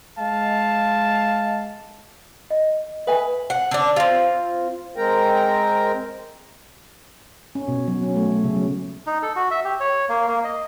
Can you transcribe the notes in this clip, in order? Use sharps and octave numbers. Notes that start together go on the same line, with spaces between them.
G#3 F5 A5
D#5
A4 B4 E5 G#5 A5
F#5
D3 D4
C4 F4
G#3 C4 A#4 G5 A#5
C#4
B2
F#3
C#4
A3
A3
C#3
F#3
D#4
A4
F#4
E5
G4
C#5
A#3
A#3
D#5